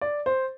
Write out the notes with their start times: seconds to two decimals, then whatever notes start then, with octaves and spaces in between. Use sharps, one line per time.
0.01 D5
0.26 C5